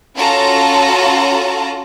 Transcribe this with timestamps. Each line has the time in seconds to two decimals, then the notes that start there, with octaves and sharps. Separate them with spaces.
0.16 C#4 F4 F#4 A4 A5 A#5